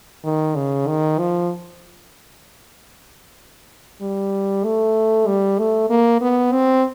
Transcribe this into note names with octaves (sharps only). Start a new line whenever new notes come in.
D#3
C#3
D#3
F3
G3
A3
G3
A3
A#3
B3
C4